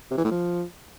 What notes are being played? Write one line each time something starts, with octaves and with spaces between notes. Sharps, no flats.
C3
E3
A2
F3